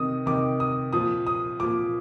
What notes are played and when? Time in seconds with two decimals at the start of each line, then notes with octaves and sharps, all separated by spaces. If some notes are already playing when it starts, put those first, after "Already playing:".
Already playing: C3 D#3 D#6
0.26 C3 D#3 D6
0.60 D#6
0.93 A#2 F3 D#6
1.27 D#6
1.60 A#2 F3 D6